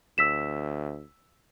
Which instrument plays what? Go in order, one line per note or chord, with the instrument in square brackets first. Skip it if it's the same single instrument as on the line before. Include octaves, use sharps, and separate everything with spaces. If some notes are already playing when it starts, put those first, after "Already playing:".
[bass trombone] D2 [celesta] E6 B6 E7